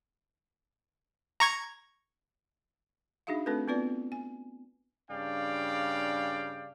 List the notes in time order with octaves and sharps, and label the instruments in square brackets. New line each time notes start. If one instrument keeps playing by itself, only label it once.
[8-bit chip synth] A#5 C#6 G#6
[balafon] D4 D#4 F#4 G#4 E5 F5
A3 C4 D4 F#4 A4 B4
B3 C4 F4 B4 D5
G#5
[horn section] G2 C#3 D4 D5 F5 G5